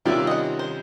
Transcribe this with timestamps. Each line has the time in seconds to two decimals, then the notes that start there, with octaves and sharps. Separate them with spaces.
0.05 C3 D#3 G3 C#4 F4 G4 D5 E5
0.27 D#5 F#5
0.59 C5